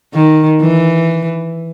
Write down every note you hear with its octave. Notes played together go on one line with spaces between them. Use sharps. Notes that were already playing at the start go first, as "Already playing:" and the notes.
D#3
E3